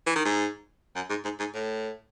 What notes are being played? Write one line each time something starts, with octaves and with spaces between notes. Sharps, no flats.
E3
D#3
G#2
F#2
G#2
G#2
G#2
A2